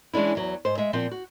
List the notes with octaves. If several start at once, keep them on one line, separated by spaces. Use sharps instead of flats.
E3 G#3 C#4 D4 E4
E2 F#3
G#2 C5
G#3 E5
A#2 F3 C4
F#4